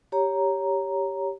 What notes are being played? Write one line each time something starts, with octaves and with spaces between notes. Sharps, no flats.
G4 C#5 A#5